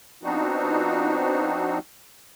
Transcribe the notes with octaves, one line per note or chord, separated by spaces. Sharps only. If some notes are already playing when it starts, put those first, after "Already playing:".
F3 B3 C4 D4 D#4 F#4